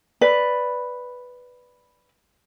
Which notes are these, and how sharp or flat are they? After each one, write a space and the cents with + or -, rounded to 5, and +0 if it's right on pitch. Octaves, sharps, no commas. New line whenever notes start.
B4 +0 D5 +0